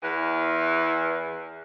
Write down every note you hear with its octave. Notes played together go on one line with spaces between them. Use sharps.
E2 E3